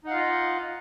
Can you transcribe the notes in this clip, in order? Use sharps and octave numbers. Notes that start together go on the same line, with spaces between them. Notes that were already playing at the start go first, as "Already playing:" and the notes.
D#4 F4 D#5 F5 F#5